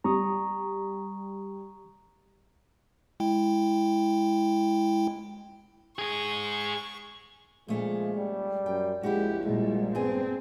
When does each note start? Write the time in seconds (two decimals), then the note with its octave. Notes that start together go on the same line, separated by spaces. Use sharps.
0.04 G3 A#5 C#6 D#6
3.20 G#3 E4 G5
5.99 G#2 G#4 C#6
7.68 A#2 F3 G#3 A3 C#4
8.16 G3
8.66 F#2 G5
9.03 A#1 G#3 E4 F#4 G4
9.45 A#2 G3 G#3
9.95 G2 B3 C4 G#4